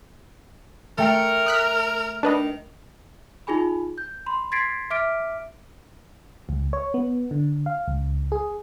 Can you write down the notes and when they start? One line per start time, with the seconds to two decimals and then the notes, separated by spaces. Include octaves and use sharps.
0.98 A3 A#4 G5 C#7
1.46 D#6 F#6 B6
2.23 D#3 D4 B4 D#5
3.47 D#4 F4 G#4 G#5 B5
3.98 G6
4.26 B5 C6
4.52 C6 G#6 A6 B6 C7 D7
4.90 E5 D6 F6 B6 D7
6.49 C#2
6.73 C#5
6.94 B3
7.31 D3
7.66 F5
7.88 C#2
8.32 G#4